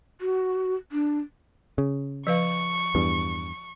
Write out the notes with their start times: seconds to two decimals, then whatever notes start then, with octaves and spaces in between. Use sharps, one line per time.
0.21 F#4
0.92 D4
1.78 C#3
2.27 F3 B4 F5 C#6
2.95 E2 G2